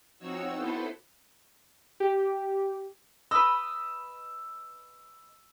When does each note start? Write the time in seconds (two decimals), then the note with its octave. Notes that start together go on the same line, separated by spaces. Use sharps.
0.19 F3 C4 D#4 F#4 C#5 E6
0.53 B3 E4 A4 B4 C5
2.00 G4
3.31 B4 D#5 E6